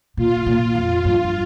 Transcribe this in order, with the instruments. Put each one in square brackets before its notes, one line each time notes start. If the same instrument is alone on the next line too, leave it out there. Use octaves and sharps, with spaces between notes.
[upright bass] A#2 [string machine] F4
[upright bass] A#2
F2
G2